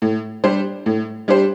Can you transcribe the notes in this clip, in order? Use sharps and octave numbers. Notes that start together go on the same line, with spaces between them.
A2
G3 D4 G4 C5
A2
G3 D4 G4 C5